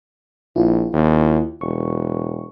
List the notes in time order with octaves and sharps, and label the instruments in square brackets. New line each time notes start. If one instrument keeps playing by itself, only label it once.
[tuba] A#1 [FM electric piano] E4 F4
[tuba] D#2
[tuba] E1 [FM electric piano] C#6